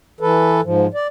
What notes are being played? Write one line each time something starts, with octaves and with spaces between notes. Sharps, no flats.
E3 A4 B4
G#2 F3
D5